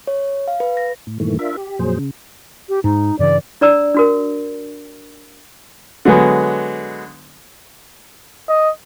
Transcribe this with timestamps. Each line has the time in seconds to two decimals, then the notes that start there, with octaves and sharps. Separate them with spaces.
0.07 C#5
0.48 F5
0.60 B4
0.77 A#6
1.07 A2
1.20 G2 A#2 D#3 E3 A3
1.39 D4 F4 A#4 E5
1.57 G4
1.79 F2 A#2 F#3 G#4 C5
1.99 C#3
2.69 G4
2.84 G#2 D#4
3.19 G2 C#3 E3 D5
3.61 D4 D5 A#5 E6
3.94 D4 F#4 A#4
6.05 D3 F#3 G#3 B3
8.49 D#5